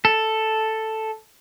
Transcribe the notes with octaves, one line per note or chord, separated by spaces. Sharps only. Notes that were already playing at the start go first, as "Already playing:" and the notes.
A4